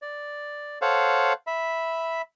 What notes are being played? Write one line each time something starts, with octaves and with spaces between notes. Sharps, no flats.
D5
A4 C5 C#5 F5 F#5
E5 B5